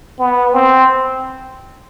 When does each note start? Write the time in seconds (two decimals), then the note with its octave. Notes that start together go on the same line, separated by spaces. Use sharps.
0.19 B3
0.54 C4